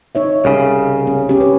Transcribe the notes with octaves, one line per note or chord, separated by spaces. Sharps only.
D#4 C#5 E5
C2 C#3
C#4
C#4 G4
B4